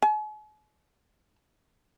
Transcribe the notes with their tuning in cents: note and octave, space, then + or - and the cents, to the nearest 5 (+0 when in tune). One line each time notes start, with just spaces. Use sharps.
G#5 +45